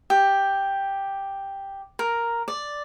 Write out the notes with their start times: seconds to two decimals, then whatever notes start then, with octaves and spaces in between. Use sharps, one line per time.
0.10 G4
1.99 A#4
2.48 D5